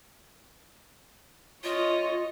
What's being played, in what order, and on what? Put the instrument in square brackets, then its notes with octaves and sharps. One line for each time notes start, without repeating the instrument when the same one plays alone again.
[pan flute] F4 [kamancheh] C#5 D#5